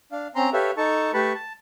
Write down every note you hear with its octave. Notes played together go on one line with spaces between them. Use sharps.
D4 F5
C4 C#4 A#5 C6
G4 A4 B4 C#5 E5 F5
D#4 A4 A5 C#6
A3 G4 B4 A5 B5 C#6
A5